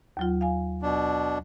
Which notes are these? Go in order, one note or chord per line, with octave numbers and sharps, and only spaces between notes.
D#2 F#3 F4
F5 G#5
B2 D4